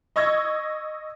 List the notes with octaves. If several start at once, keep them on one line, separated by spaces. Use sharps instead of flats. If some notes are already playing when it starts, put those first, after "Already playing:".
D#5 C#6 E6 G#6 A#6